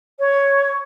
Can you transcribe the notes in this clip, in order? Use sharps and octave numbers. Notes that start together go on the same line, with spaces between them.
C#5